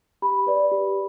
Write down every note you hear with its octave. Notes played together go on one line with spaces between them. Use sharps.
G4 B5
B4 D5
G4